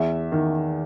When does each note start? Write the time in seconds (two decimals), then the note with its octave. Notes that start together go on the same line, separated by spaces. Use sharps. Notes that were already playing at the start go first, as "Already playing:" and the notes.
Already playing: E2 E5
0.32 D#3